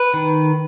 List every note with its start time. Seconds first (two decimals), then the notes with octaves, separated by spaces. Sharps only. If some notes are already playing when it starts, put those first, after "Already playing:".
Already playing: B4
0.14 D#3